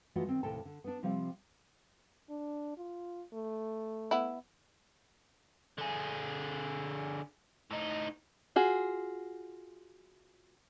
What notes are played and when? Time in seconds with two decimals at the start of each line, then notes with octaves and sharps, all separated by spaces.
0.16 E3 A3 F4 F#4 D#5 F#5
0.27 D#3 C4
0.43 D#2 A2 C3 A4 G5 A5
0.65 D3
0.84 B3 D4
1.03 C3 F3 G3 C4 F5
2.30 D4
2.77 F4
3.33 A3
4.11 B3 E4
5.78 D3 G#4
7.71 A2 D#4
8.56 F4 F#4 G#4